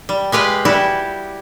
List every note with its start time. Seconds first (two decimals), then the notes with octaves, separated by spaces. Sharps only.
0.09 G3
0.32 G#3 G4 B4 F5
0.65 G3 E4 F#4 G4